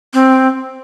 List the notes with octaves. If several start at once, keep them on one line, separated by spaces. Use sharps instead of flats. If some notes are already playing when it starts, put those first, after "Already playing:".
C4